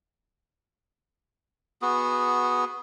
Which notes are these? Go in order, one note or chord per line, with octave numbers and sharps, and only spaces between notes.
B3 F#4 G#4